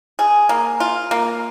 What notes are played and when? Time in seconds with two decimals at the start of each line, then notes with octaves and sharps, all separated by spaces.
0.19 G#4
0.49 A#3
0.80 F4
1.11 A#3